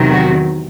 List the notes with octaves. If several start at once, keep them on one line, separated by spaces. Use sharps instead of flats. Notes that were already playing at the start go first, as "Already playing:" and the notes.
Already playing: E2 C3 D#3 F#3
F#4